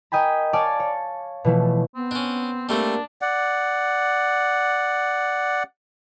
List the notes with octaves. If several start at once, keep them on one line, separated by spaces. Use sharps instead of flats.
A#4 D#5 G5 G#5 B5
C#5 D5 F5 G#5 A5
C#5
B2 E3 F3 A3
B3 C4
C#4 D4
G3 A3 A#3 C4 D4
D5 F#5